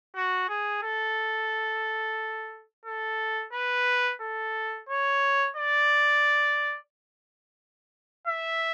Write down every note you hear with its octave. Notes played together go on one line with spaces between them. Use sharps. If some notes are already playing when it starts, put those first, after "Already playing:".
F#4
G#4
A4
A4
B4
A4
C#5
D5
E5